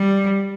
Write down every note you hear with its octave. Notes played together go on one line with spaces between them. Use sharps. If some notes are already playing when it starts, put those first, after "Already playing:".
Already playing: G3